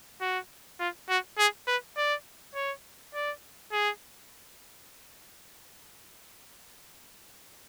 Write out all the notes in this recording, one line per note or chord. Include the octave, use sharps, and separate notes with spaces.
F#4
F4
F#4
G#4
B4
D5
C#5
D5
G#4